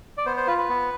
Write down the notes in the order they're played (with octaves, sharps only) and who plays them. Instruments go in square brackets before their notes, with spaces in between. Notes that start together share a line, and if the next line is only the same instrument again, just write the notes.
[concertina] D5
B3 C5
C5
F4 B4
B4
B3